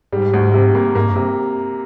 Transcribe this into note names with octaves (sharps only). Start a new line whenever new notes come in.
G#2 G3
D2
C3
A#3
G#2 A#3
G2
C3